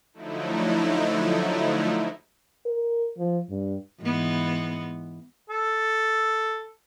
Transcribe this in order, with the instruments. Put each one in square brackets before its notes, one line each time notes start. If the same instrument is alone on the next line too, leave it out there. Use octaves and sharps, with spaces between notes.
[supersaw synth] D3 F3 F#3 A3 D#4 E4
[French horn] A#4
F3
G2
[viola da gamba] G#2 E3 B3
[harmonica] A4